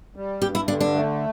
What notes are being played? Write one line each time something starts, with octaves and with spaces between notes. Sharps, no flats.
G3
G2 G4
E4
D3 D4
D4
A3